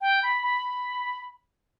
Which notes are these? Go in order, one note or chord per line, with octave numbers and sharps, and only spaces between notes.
G5
B5
B5